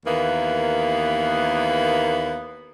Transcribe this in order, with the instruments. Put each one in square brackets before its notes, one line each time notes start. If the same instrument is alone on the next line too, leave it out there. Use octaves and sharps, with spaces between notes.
[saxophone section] D#2 E3 A#3 B3